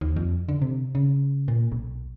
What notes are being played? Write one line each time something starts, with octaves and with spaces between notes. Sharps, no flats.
D#2
F2
D3
C3
C#3
A#2
B1